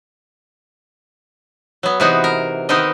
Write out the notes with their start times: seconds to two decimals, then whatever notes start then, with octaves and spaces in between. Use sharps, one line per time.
1.83 F#3 B3
2.00 C3 E3 B3 D#4 F#4 G#4
2.24 A#4
2.69 D#3 B3 C4 D#4 A#4 D#5